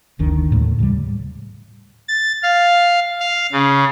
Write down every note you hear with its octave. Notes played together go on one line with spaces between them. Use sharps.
F#1 D2 D#3 D4
D#2 A2 G3 A3
A2 C#3 F#3 G3
A6
F5
F5
C#3